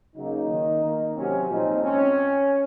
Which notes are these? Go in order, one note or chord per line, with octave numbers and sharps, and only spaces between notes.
C#3 F#3 A#3 D#4
D#3 A#3
D#3 A#3
C3 F#3 C4 C#4
A#2 F3 G#3 C4 D#4
C4 C#4